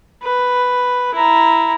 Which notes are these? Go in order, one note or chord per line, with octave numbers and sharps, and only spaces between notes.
B4
E4 A#5